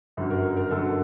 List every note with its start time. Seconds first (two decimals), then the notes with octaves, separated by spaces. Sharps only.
0.17 G1 F#2 D3 F#3
0.30 A#4
0.57 A#4
0.71 G1 F#2 D3 F#3 A4